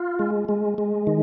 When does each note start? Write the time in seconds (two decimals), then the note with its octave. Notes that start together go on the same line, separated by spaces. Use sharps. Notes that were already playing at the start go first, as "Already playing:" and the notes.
Already playing: F4
0.19 G#3
0.49 G#3
0.78 G#3
1.07 D#3